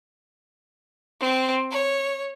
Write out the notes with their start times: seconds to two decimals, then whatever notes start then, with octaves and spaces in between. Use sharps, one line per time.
1.20 C4
1.70 C#5